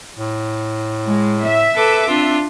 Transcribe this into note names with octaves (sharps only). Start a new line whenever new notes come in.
A2
G#3
E5
A4 B4 D6
C4 D4 F4